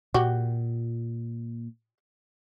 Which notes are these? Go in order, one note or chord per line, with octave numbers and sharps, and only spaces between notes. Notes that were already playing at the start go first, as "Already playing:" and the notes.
A#2 F#4 G4